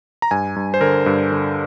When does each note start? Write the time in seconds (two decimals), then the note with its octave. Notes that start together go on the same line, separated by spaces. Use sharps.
0.22 A#5
0.31 G2 G#5
0.56 G2
0.74 C5
0.81 D3 A#4
1.06 G2
1.32 D3